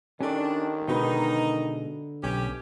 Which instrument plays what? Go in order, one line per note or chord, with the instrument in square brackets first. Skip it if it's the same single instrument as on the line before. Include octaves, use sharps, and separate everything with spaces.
[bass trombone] D#3 [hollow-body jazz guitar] C#4 [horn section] D4 [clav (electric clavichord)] G4 A4 C#5
[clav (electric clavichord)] B2 G#3 [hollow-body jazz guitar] D3 B4 [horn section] D#4
[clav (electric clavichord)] B1 [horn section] C#4 G4